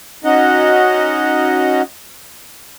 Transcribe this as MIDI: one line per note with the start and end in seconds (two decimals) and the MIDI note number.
0.24 1.82 61
0.24 1.82 63
0.24 1.82 66
0.24 1.82 75
0.24 1.82 78